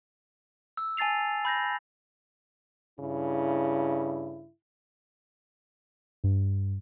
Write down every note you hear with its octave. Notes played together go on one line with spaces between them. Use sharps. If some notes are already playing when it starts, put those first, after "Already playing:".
E6
G#5 A5 A6 C7 F7
B5 G6 A#6
G2 C#3 E4
G2